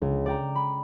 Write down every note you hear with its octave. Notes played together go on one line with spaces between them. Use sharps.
C#2
D5 G5 A#5
B5